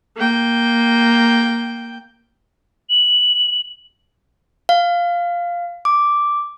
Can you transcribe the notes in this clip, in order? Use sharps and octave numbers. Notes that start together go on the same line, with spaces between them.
A#3 G5
F#7
F5
D6